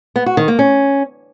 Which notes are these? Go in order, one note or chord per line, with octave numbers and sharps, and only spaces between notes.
B3
F#4
D#3
A#3
C#4